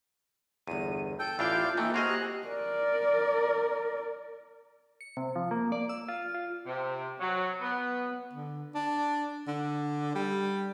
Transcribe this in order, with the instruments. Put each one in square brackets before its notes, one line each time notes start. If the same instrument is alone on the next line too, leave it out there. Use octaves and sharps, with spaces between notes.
[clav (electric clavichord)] G1 E2 [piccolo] D#7
[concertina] A4 G5 [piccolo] G6
[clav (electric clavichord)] A1 D4 G5 [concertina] E4 D5 F5 [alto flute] F4
[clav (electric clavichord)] E3 A3 [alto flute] A#3 [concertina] D#4 A4 G5
[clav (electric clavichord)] C4 G#4 D#5 [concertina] F#4 A#5 [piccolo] F6
[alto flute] G4 [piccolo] F#6
[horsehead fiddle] A#4 D5
[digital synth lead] C#7
C3
F3
A#3
D5
E6
F4
F4
[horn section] C3
F#3
B3
[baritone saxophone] D3
D4
D3
G3